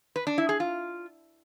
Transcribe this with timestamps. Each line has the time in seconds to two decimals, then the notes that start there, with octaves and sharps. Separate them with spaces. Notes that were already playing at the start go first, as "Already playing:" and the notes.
0.16 B4
0.27 D4
0.38 E4
0.49 G#4
0.60 F4